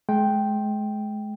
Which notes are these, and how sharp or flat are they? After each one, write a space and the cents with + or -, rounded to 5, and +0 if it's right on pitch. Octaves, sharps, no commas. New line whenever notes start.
G#3 +35 G5 +0